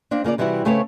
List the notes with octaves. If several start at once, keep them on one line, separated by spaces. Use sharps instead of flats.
A#3 C4 D4
C#3 A#3 F4 D5
C3 E3 G3 C4 E4 F#4
C#3 A3 C4 C#4 B4 C#5